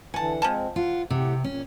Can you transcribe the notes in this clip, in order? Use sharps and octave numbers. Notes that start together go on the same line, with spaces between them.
D3 E3 F#5 G#5 A5
F3 G#3 C4 G#5 A5
F4 F#5
A2 C3 G4 F#5
A#2 C#4